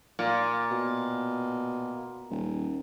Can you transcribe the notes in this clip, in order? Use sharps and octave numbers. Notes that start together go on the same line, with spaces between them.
A#2
B2
D#1